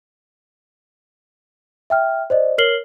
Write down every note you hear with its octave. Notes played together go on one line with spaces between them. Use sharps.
E5 G5 F6
C5 D5 D#5
A#4 C#5 F6 C7 F#7 G7